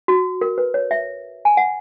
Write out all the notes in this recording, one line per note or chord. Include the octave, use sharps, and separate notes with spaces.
F#4
A#4
B4
C#5
E5
G#5
F#5